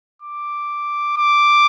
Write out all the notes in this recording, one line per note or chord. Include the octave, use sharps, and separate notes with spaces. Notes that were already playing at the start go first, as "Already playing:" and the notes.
D6
D6